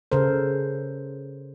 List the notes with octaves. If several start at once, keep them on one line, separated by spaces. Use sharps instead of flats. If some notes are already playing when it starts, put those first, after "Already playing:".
C#3 A4 A#4 C5